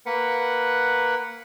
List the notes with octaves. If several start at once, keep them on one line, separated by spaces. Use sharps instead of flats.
A#3 B4 F#5